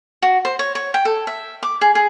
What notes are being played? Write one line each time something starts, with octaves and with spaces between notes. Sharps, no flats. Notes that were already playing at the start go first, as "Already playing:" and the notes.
F#4
C5
C#5
C#5
G5
A4
E5
D6
G#4
G#4